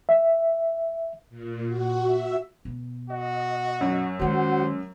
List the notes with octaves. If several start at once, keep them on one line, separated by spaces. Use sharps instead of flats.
E5
A#2
F#4
E5
B2
F#4 D#5
F#2
D#3 G#3 F#4 C5 F#5